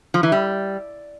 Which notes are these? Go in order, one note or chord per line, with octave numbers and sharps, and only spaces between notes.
F3
E3
G3